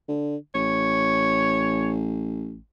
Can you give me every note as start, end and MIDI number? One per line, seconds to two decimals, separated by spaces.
0.08 0.36 50
0.55 2.59 33
0.55 1.92 73